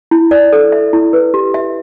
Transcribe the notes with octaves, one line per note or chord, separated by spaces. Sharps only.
E4
D5
A4
E5
E4
B4
G4
E5